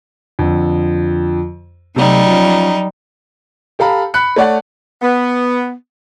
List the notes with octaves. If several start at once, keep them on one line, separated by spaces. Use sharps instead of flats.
F2 D3
C3 F#3 G3 A3 D#4
F3 C#4 F4
G4 A4 F5 A#5 B5
B5 F#6 C#7
A3 C#5 D5 F#5
B3